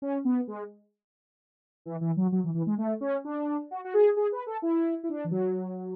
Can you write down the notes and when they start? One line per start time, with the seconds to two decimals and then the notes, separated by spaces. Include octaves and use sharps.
0.02 C#4
0.25 B3
0.48 G#3
1.86 E3
2.01 E3
2.17 F#3
2.32 F#3
2.44 E3
2.54 E3
2.67 G#3
2.78 A3
3.01 C#4
3.25 D4
3.71 F#4
3.85 F#4
3.94 G#4
4.16 G#4
4.32 B4
4.46 A4
4.62 E4
5.04 E4
5.09 D4
5.24 E3
5.31 F#3